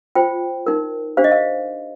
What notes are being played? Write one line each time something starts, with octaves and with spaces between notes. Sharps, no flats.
F4 C5 G5
D#4 A#4
D4 G4 C5 F5
D#5
F5